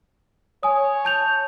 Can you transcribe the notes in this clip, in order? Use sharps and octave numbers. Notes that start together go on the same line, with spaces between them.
C#5 G#5 D#6
A5 G6 F7